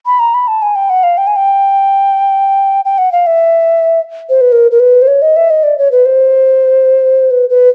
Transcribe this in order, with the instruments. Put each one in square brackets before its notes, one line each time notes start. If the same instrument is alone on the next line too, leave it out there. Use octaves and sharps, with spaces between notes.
[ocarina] B5
A#5
B5
A5
G#5
G5
F#5
F5
G5
G#5
G5
G5
F#5
F5
E5
C5
B4
A#4
A#4
B4
C5
C#5
D#5
E5
D#5
D5
C#5
B4
C5
B4
B4